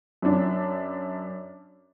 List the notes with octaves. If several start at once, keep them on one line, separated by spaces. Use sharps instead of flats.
F#2 D4